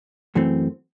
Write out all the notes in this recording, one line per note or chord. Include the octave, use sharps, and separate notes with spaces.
F#2 E3 A3 C4